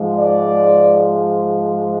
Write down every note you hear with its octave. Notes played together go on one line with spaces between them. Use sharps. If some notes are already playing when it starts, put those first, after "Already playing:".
Already playing: G#2 F3 G#3
D5